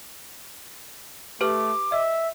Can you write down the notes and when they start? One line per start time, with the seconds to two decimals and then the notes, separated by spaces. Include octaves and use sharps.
1.41 A3 G4 B4 D6 F6
1.92 D#5 E5